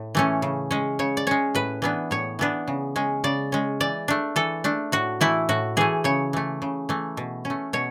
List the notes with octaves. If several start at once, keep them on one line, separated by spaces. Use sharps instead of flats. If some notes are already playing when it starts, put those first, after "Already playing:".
Already playing: A2
E3 A3 C#4
C#3
G#3 C#4
C#3 C#5
D5
G#3 C#4 C#5
A2 B4
E3 B3 D4
A2 C#5
E3 B3 D4
C#3
G#3 C#4
C#3 D5
G#3 C#4
E3 D5
A3 D4
E3 A4
A3 D4
A2 F#4
E3 A3 E4
A2 F#4
E3 A3 G#4
C#3 C#5
E3 A3
C#3
E3 A3
B2
C#4
A3
B2 C#5